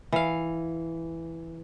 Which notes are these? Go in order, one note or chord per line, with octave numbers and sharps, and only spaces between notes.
E3 F5